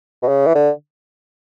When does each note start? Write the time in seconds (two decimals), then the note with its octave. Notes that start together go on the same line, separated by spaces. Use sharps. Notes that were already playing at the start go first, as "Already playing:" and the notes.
0.23 B2
0.28 C#3
0.47 E3
0.55 D3